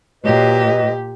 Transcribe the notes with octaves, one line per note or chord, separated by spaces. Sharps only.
A#2 F#3 G4 B4 D#5